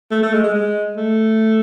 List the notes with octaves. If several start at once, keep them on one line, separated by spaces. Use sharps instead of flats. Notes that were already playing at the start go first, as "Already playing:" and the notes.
A3
A3
G#3
G#3
G#3
A3